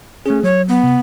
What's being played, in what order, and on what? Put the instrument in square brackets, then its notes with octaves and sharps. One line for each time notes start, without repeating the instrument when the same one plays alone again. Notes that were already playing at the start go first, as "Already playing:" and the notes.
[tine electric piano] A3 G#4 [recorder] C#4
[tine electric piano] F#3 [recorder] C#5
[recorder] B3
[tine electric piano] C3